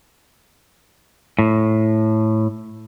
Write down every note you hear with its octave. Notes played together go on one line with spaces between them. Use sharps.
A2